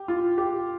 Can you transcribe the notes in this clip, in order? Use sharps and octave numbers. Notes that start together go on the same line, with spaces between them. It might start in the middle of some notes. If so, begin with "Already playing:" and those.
Already playing: G4
F4
G4